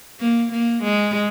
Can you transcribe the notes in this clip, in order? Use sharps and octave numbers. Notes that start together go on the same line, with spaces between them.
A#3
A#3
G#3